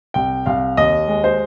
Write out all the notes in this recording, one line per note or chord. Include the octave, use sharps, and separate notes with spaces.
C2 G5
C2 F5
D#2 D#5
G#3
C5